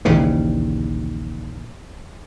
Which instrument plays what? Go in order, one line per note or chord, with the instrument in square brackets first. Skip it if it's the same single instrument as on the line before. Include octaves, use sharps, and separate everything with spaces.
[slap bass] A#1 D#2 C#3 E3